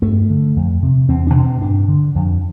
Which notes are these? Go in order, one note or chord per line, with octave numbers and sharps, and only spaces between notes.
G2 A3
D3
F2
C3
E2 C4
D4
B2
C4
G2 D4
D3
F2